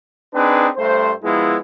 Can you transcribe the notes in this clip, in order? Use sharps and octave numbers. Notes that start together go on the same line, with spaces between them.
C4 D4 D#4 G#4 B4
G2 A3 C5
F3 G#3 B3 E4